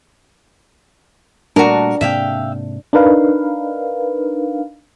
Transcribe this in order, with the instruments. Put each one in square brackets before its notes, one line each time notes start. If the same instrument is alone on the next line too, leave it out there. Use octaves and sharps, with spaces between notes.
[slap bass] A#2 G3 A3 [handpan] D4 [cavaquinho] F#4 A#4
[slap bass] G#2 C3 A#3 [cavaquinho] E5 F5 G5
[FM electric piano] D4 D#4 A#4 B4 F5